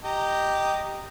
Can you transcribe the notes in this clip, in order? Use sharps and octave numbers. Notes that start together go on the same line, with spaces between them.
G4 D#5 A#5